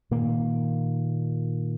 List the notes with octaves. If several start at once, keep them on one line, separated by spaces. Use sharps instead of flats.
A#2 D#3 A#3